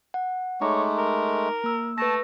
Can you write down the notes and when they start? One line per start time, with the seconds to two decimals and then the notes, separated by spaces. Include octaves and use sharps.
0.14 F#5
0.61 G#3 A3 D#4 C#5 A#5 D6
0.99 A#4
1.64 A#3 E6
1.98 A3 B4 A5 A#6